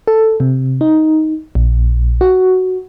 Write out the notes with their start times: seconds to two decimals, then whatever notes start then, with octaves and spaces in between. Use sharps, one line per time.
0.07 A4
0.40 C3
0.81 D#4
1.55 A#1
2.21 F#4